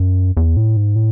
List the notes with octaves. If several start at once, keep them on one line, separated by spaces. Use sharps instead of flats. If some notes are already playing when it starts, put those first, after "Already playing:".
Already playing: F#2
E2
A2
G#2
A2